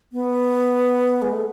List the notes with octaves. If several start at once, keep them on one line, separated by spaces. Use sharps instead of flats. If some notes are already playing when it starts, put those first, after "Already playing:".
B3
G#3
A3